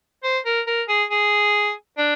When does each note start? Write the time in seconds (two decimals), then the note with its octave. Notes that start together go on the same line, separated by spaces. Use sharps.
0.23 C5
0.45 A#4
0.67 A#4
0.89 G#4
1.10 G#4
1.98 D4